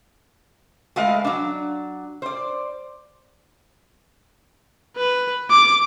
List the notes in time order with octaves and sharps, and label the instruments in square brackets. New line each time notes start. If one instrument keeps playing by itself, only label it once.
[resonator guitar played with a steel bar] G#3 A3 A4 B4 D#5 F5
F#3 D4
C5 D5
[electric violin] B4
D6